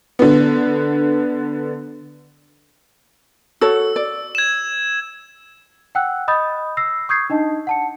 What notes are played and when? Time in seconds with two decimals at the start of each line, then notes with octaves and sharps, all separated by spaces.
0.19 D3 B3
3.61 F#4 A4 C#5 E6
3.96 D5
4.35 G#6 E7
5.95 F#5 G5 E6 F#6
6.28 D#5 B5 D#6 G6 A6
6.77 E6 A#6 C7
7.09 C#6 D#6 G6 G#6 C7
7.30 D4 D#4 D#5 A5
7.67 F#5 A5 C#7